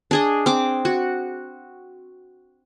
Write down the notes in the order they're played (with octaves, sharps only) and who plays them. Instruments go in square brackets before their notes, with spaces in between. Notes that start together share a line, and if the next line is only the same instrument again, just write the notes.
[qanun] D4 G#4 D#5
C4 D6
F#4